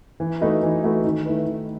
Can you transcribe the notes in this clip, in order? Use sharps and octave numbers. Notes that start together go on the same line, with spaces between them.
E3
A3 D#4 F#4 B4
E3
A3 D#4 F#4 B4
D#3
A3 E4 B4
D#3